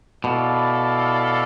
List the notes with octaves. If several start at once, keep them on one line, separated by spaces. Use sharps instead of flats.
B2 E4 A4 D5 F5